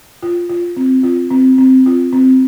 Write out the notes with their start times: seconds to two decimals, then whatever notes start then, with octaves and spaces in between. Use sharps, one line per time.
0.23 F4
0.49 F4
0.77 C4
1.03 F4
1.30 C4
1.58 C4
1.86 F4
2.13 C4